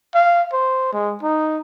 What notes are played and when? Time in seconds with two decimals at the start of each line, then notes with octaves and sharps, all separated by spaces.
0.15 F5
0.53 C5
0.93 G#3
1.23 D#4